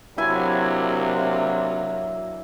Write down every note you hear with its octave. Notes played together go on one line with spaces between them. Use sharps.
C3 F#3 A#3 D4 E4 G#5